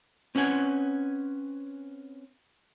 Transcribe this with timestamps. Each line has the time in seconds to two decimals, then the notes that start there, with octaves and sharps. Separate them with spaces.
0.35 C4 C#4 B4 F#5 G#5